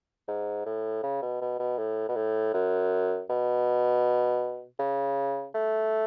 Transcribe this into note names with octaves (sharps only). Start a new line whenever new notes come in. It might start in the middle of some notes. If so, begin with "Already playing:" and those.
G#2
A2
C#3
B2
B2
B2
A2
B2
A2
F#2
B2
C#3
A3